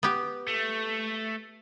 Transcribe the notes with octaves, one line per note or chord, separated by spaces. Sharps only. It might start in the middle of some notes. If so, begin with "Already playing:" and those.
B3 G4
A3